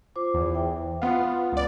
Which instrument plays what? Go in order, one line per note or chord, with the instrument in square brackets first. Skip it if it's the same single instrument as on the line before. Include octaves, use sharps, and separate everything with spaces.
[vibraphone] F4 C5 D6
[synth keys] E2
[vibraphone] E5 G5
[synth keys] B3 F4 [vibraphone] F#5
[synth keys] C#2 D5